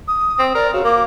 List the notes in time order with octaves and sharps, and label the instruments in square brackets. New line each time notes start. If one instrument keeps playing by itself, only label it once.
[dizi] D#6
[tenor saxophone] C4
[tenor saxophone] A#4 [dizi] D5
[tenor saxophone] C#3 [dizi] F#4
[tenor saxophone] A#3 [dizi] D6